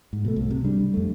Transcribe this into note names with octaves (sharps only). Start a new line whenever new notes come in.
G#2
B2 G#3 A3
C2
C3
G3 D4
F2 A3